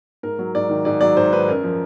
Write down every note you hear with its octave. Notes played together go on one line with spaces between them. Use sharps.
G#2 A#4
F#3
G#2 D5
D#3
G#2 D5
F#3 D5
G#2 C5
D#3 B4
F#2 A#4
F3